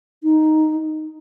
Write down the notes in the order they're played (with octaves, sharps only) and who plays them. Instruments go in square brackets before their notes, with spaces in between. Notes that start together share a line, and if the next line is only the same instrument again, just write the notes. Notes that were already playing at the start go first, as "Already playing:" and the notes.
[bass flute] D#4